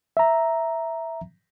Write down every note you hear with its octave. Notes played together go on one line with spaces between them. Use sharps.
E5 A#5